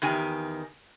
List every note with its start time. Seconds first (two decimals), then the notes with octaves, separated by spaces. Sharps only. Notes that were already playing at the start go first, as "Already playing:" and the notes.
0.02 E2 D#3 G4 G#5